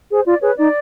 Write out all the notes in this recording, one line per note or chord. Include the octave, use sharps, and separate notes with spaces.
G#4 C5
F4 D5
G#4 B4 C#5
D#4 D5